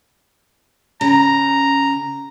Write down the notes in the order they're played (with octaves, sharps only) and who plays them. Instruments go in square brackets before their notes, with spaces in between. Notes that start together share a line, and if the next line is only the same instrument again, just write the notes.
[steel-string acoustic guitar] C#3 [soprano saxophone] A#5